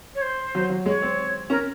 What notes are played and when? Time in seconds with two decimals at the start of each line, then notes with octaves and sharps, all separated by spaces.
0.15 C#5
0.22 C5
0.55 F#3
0.70 F#3
0.86 G#3 C#5
1.02 C4
1.50 C#4 A#4